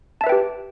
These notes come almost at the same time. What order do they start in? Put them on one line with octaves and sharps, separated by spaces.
A5 E5 B4 G5 G4